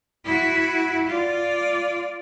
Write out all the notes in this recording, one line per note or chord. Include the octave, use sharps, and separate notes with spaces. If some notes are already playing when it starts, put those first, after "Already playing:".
E4 F#4
F4 D5